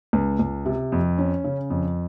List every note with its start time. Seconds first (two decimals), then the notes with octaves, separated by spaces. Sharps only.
0.13 C#2
0.39 C#2
0.66 C3
0.92 F2
1.18 C#4
1.44 C#3
1.70 F2